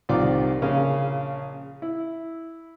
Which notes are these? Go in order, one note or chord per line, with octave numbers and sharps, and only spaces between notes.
C2 D#3 F3 F4 D5 D6
A#1 C#3 C#4 A#4 F5
E4